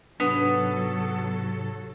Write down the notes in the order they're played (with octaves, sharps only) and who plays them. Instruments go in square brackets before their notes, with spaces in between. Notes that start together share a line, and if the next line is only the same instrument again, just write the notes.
[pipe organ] G#2 C3 [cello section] F#3 A4 [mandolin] B3 [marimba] D4